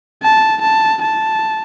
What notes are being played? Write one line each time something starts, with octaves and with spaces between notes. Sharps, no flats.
A5
A5
A5